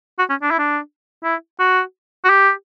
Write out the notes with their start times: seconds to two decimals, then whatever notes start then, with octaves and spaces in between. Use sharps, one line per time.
0.18 F#4
0.29 C#4
0.42 D4
0.51 E4
0.58 D4
1.24 E4
1.59 F#4
2.24 F#4
2.29 G4